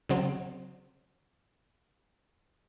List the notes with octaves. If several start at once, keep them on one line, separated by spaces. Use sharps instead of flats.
C#3 F#3 C4